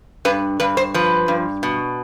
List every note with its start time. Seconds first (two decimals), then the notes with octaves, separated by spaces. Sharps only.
0.25 G2 B4
0.60 G2 B4
0.77 C5
0.94 F3 B4
1.28 G2
1.63 B2